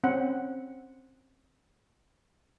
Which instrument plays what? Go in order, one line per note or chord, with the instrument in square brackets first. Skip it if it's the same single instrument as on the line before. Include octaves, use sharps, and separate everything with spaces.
[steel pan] C4 C#4 F#5